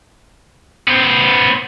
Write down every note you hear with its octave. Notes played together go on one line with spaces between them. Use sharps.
B3 C5